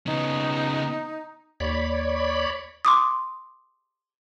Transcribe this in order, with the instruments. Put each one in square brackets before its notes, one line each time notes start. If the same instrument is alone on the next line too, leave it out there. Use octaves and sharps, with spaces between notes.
[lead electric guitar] C#3 B3 [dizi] D#4
[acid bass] D#2 [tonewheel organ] C#5 D5 B5
[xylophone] C6 D6 D#6